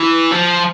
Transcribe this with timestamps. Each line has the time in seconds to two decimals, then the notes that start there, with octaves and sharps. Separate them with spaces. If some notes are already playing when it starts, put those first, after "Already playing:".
Already playing: E3
0.32 F3